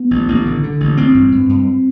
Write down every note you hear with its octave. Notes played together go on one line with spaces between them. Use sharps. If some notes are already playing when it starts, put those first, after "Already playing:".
Already playing: B3
A1
A1
D3
D3
A1
A1 C4
G2
G2
G2